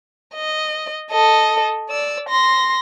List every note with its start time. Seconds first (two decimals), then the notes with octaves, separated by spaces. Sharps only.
0.35 D#5
1.11 A4 D#5
1.90 D5 E6
2.29 C6 A#6